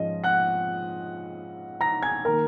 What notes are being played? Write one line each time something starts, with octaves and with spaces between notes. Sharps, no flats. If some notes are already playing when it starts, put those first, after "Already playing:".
Already playing: G#2 F3 G#3 C#4 F4 D#5
F#5 F#6
A#5 A#6
G#5 G#6
D#3 A#3 A#4 A#5